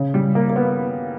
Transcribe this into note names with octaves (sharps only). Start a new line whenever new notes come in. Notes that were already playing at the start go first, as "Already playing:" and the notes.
Already playing: C#3
G3
A#3
A#3
B3